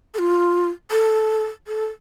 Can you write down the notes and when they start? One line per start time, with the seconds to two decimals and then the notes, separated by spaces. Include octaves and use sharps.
0.14 A4
0.19 F4
0.91 A4
1.67 A4